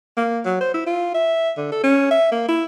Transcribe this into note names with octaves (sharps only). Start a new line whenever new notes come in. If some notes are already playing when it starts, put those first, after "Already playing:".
A#3
F#3
C5
E4
F4
E5
D3
A4
C#4
E5
A#3
E4